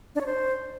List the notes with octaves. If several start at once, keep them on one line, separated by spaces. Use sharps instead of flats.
D4
C#5
C5